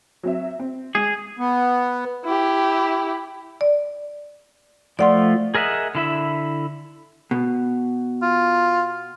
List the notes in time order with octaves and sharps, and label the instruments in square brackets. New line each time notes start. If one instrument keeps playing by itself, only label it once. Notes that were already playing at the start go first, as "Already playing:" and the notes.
[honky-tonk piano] F#3 C4 E5
C4
[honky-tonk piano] G#3 [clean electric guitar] G#4
[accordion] B3
[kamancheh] E4 G4
[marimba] D5
[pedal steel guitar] F3 A3 F4 [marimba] D5 F#5 C6
[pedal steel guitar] G#4 A#4 D#5 E5 F#5
D3 E4 E5
[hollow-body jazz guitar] B2
[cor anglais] F4